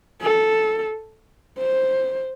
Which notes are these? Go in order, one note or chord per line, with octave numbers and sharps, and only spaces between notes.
A4
C5